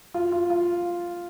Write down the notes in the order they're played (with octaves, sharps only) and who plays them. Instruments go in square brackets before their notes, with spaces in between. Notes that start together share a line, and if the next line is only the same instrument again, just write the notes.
[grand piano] F4
F4
F4